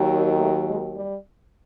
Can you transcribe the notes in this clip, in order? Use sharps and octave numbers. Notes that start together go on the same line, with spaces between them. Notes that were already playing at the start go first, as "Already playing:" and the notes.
Already playing: D#2 D#3 F#3
A3
G#3
G3